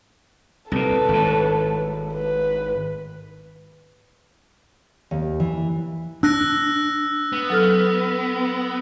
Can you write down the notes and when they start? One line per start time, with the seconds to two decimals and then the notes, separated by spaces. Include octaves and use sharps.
0.72 C2 A#2 A4 B4
1.09 G#1 A2
2.14 B4
5.11 D#2
5.40 E3
6.23 D4 E6 F#6 A#6
7.32 B3
7.50 F#3 A4 F6